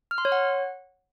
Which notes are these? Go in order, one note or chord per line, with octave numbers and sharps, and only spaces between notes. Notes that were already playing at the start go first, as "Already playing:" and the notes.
F6
C6
C#5
F#5